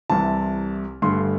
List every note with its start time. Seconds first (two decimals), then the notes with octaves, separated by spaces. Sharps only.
0.10 C2 C3 E3 A5
1.02 G1 G2 D3 A3 C6